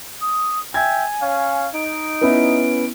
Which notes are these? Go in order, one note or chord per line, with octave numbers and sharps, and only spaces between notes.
D#6
E5 G5 G#5 G#6
C#4 C#5 F5
D#4 D7
B3 C#4 E4